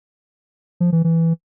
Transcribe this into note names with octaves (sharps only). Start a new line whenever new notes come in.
F3
E3
E3